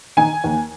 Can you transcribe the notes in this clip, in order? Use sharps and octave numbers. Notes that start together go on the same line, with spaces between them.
D#3 G#5
D#2